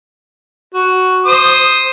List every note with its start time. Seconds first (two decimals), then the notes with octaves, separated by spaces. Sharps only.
0.74 F#4
1.26 C5 D#6